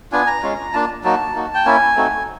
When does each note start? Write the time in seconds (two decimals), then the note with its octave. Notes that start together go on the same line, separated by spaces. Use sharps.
0.12 B3 D4 F4 G#5
0.27 A#5
0.43 G#3 C#4 F4
0.73 A#3 D4 F4 A5
1.04 F#3 A#3 D#4 F#4 A5
1.35 A#3 D#4 F#4
1.54 G5
1.66 A#3 C#4 E4 G#5
1.96 A3 C4 D#4 F#4